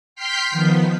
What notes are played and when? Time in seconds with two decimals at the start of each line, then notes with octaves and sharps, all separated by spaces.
0.15 G5 C6 F6 G6 B6 C7
0.51 D#3 F3 B3